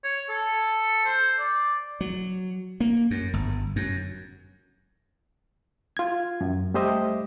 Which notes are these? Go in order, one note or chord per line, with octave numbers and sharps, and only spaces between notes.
C#5
A4
C5
D5
F#3
A#3
F#2
G1
F#2
F4 G#6
F#2
G3 A3 G4 C5 D#5 E5